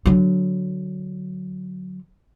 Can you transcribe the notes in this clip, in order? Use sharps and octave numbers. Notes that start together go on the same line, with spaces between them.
D3 F#3